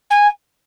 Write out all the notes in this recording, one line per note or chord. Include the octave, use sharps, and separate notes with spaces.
G#5